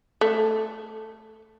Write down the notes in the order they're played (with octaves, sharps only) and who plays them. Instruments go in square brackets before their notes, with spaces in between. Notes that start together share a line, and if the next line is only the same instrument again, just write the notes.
[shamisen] A3